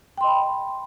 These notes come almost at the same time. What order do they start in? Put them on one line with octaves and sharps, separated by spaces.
G5 C6 D#5 B5